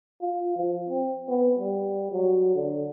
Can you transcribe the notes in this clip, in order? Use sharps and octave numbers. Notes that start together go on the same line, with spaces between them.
F4
F3
C4
B3
G3
F#3
D3